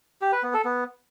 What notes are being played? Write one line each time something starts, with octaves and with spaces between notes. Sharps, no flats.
G4
B4
B3
A4
B3